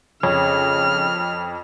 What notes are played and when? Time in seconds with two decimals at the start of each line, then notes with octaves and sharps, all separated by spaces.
0.23 F2 C#3 C#5 F6